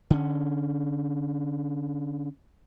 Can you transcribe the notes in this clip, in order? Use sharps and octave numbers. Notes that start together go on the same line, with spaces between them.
D3 C#4